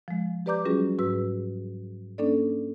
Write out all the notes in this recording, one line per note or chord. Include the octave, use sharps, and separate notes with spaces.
F3 G#3
G4 B4 D5 A#5 D6 G6
F#3 G3 C#4 F4 F#4 G#4
G#2 F#4 B4 E6
A#3 C#4 D4 A4 D5